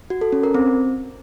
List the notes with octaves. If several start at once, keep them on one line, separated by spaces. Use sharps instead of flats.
F#4
A4
C#4
A#4
C4